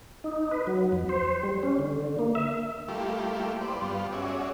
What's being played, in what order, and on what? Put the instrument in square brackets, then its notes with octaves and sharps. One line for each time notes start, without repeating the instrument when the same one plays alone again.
[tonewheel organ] D#4
B4
F#3
F2
C5
G3
C#4
D3
A#3
E5
[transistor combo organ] G3 A3 A#3 E4 F4 G4
B4 C5 D5
G2 G3 B3 F4
C#4 F#4 G#4 D5 E5